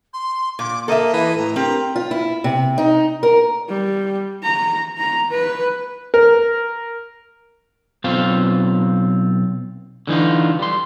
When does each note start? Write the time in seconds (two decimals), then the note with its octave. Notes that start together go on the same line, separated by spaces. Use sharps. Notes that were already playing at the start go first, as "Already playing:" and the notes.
0.14 C6
0.59 A#2 D6
0.88 A#3 A4 D#5 E5
1.13 E3
1.37 A2 A#5
1.56 C4 G4 A#4 A#5
1.96 F4
2.11 E4
2.44 C3
2.78 D#4
3.23 A#4
3.68 G3
4.43 A#5
4.98 A#5
5.31 B4
6.14 A#4
8.04 B1 C4 F4 F5
10.07 D3 E3 D#4 F4
10.59 G3 C6